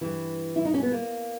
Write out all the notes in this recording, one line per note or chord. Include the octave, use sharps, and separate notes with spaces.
G2 E3
E4
D#4
C#4
B3
A#3